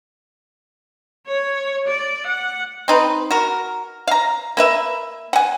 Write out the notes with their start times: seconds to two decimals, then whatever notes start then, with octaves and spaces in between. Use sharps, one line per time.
1.27 C#5
1.88 D5
2.27 F#5
2.88 C4 D#4 B4
3.31 F#4 A#4
4.08 F5 A#5
4.57 A#3 B4 E5
5.33 F#5 G#5